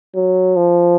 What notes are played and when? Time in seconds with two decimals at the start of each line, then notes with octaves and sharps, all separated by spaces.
0.15 F#3
0.56 F3